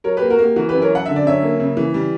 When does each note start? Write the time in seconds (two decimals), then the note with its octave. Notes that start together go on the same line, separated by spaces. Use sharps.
0.04 F#3 A#4 C#5
0.17 G4 B4
0.22 A#3
0.30 F#4 A#4
0.39 A#3
0.44 G4
0.56 E3 F#4 A#4
0.69 G4 B4
0.73 F#2
0.82 A#4 C#5
0.91 F#2 F#5
1.06 D3 E5
1.16 D5
1.25 F#2 C#5 E5
1.42 A#3
1.60 C#3
1.77 E3
1.94 G3